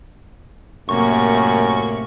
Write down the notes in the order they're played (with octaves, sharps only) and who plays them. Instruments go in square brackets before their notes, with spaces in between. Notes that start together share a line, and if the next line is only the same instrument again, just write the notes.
[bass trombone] F#2 [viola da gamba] A2 C3 [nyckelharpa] A#3 [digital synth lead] C#6